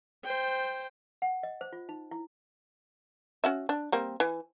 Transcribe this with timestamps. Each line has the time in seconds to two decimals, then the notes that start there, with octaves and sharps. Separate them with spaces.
0.25 C5 G5
1.22 F#5
1.43 D#5
1.61 C5
1.73 F4
1.89 D#4
2.11 E4
3.44 C#4 F#4 E5
3.69 D4
3.92 G3 A#3 C4
4.20 E3